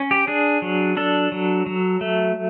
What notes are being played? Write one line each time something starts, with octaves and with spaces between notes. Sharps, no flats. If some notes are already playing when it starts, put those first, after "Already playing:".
Already playing: C#4
G4
D4 G#4
F#3
D4 A4
F#3
F#3
A3